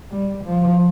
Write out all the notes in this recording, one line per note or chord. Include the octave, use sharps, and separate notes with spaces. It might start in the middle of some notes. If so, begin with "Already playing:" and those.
G3
F3